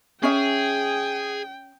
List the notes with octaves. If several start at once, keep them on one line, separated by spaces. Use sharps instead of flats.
C#4 G#4 E5 G5